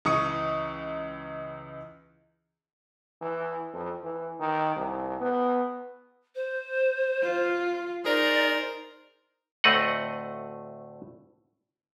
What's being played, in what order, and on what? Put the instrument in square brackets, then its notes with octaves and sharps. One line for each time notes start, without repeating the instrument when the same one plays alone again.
[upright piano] C#2 E3 C#6 D#6 C#7
[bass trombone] E3
F2
E3
D#3
C2
B3
[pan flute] C5
[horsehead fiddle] F4
[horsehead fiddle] D#4 [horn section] G#4 A#4 C5 [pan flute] D5
[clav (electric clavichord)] D2 A2 A3 C4 D#5 F#5